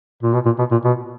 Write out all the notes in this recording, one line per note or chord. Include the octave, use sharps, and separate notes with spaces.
A#2
B2
A#2
B2
A#2
B2